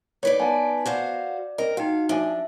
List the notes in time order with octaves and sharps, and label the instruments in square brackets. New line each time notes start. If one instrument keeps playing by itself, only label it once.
[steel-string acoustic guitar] D#4 B4 D5 [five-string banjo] C#5
[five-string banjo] B3 F#5 [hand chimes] G#5 A5
[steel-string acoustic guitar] F#4 C5 F5 [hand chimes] D5
[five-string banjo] C4 D#5 [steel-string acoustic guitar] A#4
[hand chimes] D#4 F#4 [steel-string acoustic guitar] F5 [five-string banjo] G5
[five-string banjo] F3 G#5 [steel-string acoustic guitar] D4 [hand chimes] E5